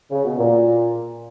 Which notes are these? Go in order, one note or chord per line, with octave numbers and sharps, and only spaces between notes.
C#3
B2
A#2